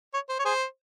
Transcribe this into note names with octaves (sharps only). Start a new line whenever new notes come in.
C#5
C5
C#5
G#4 C5